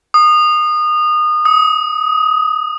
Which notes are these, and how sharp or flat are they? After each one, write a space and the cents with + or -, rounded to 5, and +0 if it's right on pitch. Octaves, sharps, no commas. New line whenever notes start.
D#6 -25
D#6 +25